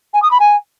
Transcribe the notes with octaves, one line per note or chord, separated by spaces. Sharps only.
G#5
D#6
B5
G#5